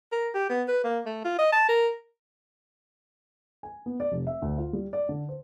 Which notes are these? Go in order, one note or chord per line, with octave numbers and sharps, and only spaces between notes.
A#4
G4
B3
B4
A#3
A3
F4
D#5
A5
A#4
G#5
B3
D5
F1
E5
D2
F4
G3
D5
D3
C5